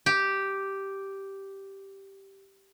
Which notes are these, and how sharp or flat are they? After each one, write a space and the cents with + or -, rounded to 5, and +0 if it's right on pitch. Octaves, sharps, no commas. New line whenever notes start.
G4 -5